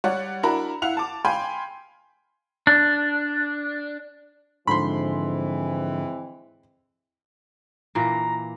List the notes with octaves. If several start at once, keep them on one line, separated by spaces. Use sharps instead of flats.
G3 C#5 D5 F#5
D4 E4 F#4 A#4 A#5 B5
E4 F5 F#5 F7
A5 D6
F5 G5 G#5 B5 C6
D4
G#2 D3 E3 F3 G#3 C4 B5 C6
A#2 E3 A#3 A#5